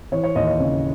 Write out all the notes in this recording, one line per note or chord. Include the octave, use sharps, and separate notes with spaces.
E3 C#5
C#5
D#2 D#5
D#5
C#3